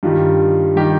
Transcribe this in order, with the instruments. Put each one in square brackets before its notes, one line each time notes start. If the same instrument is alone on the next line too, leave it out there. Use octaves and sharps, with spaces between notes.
[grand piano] G2 D#3 G3 F4
D#3 G3 G4